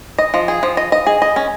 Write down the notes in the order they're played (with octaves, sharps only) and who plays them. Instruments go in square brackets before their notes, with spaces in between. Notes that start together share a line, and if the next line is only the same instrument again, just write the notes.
[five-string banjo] D#5
F3
G#4
F3
D#5
D#5
G#4
D#5
C#4